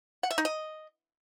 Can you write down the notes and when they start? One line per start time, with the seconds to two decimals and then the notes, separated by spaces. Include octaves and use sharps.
0.23 F#5
0.31 E5
0.38 D#4
0.45 D#5